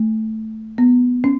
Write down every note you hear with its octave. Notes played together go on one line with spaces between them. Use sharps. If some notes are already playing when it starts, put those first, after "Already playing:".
Already playing: A3
B3
C#4